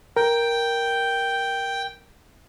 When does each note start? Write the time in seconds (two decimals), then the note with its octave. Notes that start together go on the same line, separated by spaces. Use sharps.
0.17 A#4 G5